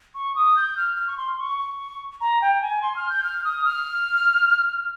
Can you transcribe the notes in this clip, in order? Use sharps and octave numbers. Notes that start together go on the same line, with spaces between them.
C#6
D#6
G6
F6
F6
C#6
C6
C#6
C#6
A#5
G5
G#5
C6
F6
G6
F6
D#6
F6